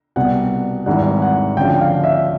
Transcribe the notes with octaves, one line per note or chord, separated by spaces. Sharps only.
C2 B2 G3 F#5
G#1 G#2 E3 G3 F#5
F#5
D2 C#3 F3 G5
F5
E5